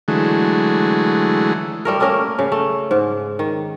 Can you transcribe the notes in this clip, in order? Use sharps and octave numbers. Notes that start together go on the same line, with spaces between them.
D3 E3 F#3 G#3 A3
G3 A3 A#4
A3 A#3 C#4 A#4
C#3
A3
G#2
D#3